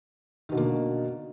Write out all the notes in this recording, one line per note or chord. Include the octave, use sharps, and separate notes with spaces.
B2 D3 D#3 A#3